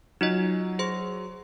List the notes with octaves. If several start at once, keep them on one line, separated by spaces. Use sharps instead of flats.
F#3 D#4 F4 D#5
G#4 C5 C6